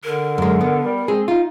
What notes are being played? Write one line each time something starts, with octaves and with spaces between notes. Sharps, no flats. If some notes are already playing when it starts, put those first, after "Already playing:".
D3 A#4
F#2 G#3
B3
G3
G#3 C4 G#4
D#4 F4